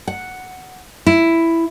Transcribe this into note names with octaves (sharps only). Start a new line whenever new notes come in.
F#5
E4